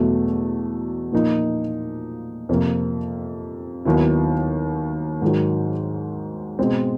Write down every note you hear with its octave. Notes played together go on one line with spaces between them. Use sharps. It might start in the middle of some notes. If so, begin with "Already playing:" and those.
Already playing: E2 B2 F#3 A3
A#2 F3 A#3 D#4
F2 C3 F3 A#3
D#2 D#3 F#3 B3 E4
G#2 D#3 F#3
B2 G#3 C4